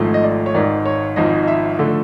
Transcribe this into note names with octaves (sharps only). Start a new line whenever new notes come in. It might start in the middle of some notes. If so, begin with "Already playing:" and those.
Already playing: G#1 G#2 F3 A3
D#5
D5
C#5
G#1 G#2 D#3 D5
C#5
G#1 G#2 F3 D#5
D#5
E5
D3 F3 A3